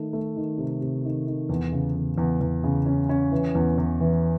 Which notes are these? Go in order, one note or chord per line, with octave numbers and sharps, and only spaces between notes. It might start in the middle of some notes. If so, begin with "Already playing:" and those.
Already playing: D#3 A3
A3
D#3
C3
C3
D#3
D#3
E2
C#3
E2
E2
E2
C#3
C#4
C#4
E3
E2
E2
E3